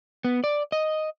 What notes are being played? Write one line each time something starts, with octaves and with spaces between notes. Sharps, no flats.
B3
D5
D#5